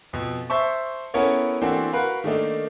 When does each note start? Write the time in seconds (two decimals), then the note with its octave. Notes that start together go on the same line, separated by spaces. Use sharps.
0.13 F2 B2
0.50 C5 E5 A5 C#6
1.14 B3 C#4 E4 A4 A#4 C#5
1.62 E3 A#3 C4 D4 F#4 A4
1.93 F#4 A#4 B4 F5
2.24 D#3 A3 A#3 D4 D#4